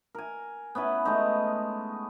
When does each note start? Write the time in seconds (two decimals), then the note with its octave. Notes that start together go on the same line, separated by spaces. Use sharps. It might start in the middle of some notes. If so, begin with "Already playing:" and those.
0.15 A#4 G#5
0.75 B3 C#4 E4 B4
1.05 G#3 A3 D#4